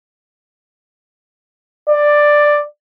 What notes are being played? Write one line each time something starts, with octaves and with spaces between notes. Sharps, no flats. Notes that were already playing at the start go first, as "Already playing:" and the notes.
D5